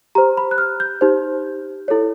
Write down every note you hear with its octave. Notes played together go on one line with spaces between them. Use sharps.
G4 C5 A#5
B5
F#6
F6
G6
D#4 G4 C5
E4 A4 C#5